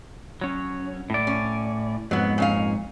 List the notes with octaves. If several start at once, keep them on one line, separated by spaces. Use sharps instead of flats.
F#3 C#4
A2 D5
C#4
F2 G#2 F#3 B3
A#2 C#4 F5